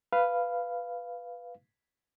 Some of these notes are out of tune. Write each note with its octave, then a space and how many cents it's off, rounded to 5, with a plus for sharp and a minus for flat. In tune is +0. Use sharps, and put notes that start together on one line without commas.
B4 +0 F5 -10